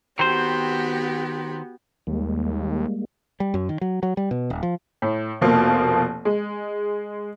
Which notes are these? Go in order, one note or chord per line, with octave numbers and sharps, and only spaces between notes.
D#3 B3 C4 F#4 G4 C5
D#2 G3 G#3 A#3
G3
F#2
D#3
F#3
F#3
G3
B2
D#1
F3
A2
F1 B2 F3 A#3 F4
G#3